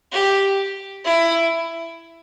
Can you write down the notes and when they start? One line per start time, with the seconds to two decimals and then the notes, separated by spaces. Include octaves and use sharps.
0.12 G4
1.05 E4